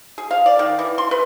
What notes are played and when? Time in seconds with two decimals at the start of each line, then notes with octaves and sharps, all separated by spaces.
0.18 G#4
0.31 F5
0.46 D5
0.59 D#3
0.79 E3
0.98 C6
1.11 B4